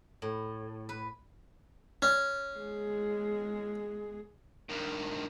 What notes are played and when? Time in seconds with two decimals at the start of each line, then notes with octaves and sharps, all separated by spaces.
0.22 A2
0.89 B4
2.02 C#4
2.57 G#3 G#4
4.69 G2 D#3